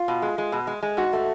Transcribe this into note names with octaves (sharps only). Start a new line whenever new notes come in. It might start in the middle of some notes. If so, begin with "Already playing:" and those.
Already playing: F4
B2
G#3
G#3
B2
G#3
G#3
G#2 F#4
A3